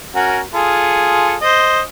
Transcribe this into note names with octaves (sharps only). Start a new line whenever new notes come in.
C#4 F#4 A#4
F4 G#4 A4
C5 D#5